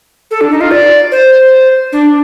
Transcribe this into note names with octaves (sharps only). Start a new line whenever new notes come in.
A4
D4
D#4
F4
D5
C5
D4